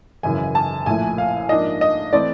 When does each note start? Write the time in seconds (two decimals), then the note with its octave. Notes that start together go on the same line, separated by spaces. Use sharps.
0.23 G#1 F#2 C#3 E3 G#5
0.55 A5
0.86 A#1 A2 F3 A3 G#5
1.18 F5
1.49 G#2 F3 A#3 D4 D#5
1.81 D#5
2.13 E3 A3 C4 D5